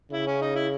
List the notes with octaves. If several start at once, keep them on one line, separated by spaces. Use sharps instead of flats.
C#3 E4
C#4
D#4
E4